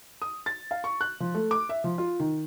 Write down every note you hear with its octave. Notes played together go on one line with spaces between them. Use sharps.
D#6
A6
F5
C#6
F#6
F3
A3
D6
E5
F3
F4
D#3